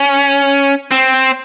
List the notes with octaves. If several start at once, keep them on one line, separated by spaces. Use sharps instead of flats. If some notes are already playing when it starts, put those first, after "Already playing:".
Already playing: C#4
C4